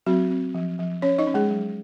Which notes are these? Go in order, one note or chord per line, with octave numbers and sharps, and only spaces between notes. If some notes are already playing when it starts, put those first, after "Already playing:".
F#3 C4 F#4
C4
F3
F3
C#4 C#5
D#4 D#5
C#4
G#3 G#4
F#3